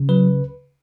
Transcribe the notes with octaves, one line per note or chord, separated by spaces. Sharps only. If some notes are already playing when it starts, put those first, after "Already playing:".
Already playing: C#3
F#3 B4